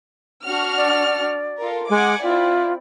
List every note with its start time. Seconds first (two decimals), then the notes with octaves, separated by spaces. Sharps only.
0.44 D4 F#4 F6
0.77 D5
1.60 F4 A4 A#4
1.90 G#3 F#5 G#5 D6
2.23 C4 E4 F4 D5